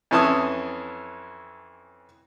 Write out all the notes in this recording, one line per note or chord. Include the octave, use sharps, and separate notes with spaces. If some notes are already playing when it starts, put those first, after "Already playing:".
F2 E3 C#4 A5 C6 D#6